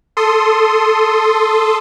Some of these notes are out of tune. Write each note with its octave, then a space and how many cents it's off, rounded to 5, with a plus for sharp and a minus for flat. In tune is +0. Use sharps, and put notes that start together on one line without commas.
A4 +0 C6 +0 D#6 +0